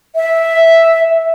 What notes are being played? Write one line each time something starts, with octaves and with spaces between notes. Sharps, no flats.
E5